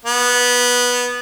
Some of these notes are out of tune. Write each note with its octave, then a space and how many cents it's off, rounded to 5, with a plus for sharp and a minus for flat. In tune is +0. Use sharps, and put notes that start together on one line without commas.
B3 -10